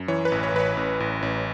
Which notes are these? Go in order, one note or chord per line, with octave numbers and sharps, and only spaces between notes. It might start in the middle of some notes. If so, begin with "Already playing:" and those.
Already playing: F#2
E3 C#5
B4
A1
C#5
A1 B4
C#5
A1
A1
A1